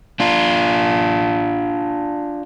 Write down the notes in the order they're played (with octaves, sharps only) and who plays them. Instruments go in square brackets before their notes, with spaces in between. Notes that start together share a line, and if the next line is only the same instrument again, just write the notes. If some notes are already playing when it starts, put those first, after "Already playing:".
[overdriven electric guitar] D4 F4